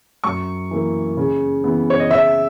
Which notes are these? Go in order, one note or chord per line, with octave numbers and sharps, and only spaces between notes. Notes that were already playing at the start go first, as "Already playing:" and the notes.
F#2 C#6
E3 A#3
C#3
E3 B3
C#5
D#5
C#3 E5